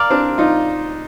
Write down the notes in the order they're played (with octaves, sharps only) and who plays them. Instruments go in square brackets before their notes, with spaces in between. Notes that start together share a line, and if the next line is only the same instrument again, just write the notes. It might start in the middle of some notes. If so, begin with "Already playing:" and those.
Already playing: [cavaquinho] A#4 D5 F5
[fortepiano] C4 D4
D#4 F4